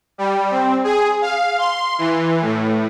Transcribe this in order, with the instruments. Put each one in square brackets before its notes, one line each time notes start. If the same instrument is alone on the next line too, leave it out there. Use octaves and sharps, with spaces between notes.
[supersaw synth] G3
C4
G#4
F5
C6
E3
A2